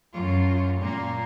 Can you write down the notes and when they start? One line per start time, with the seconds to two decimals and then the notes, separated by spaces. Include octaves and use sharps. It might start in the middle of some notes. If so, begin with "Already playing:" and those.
0.14 F#2 F4
0.80 A#2 A#3